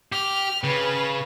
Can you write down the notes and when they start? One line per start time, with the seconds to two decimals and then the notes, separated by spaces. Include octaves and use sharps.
0.12 G4 F6
0.64 C#3 B4